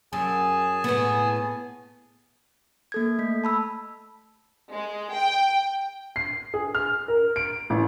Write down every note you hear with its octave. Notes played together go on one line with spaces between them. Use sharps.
F#2 G#4 G#5 A5
A2 B3
A#3 A4 G#6
A3 B6
A5 B5 E6
G#3
G5
C7
G#4
F6
A#4
D7
A1